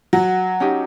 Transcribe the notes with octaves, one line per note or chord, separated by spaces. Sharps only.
F#3 F#5
C#4 D#4 G4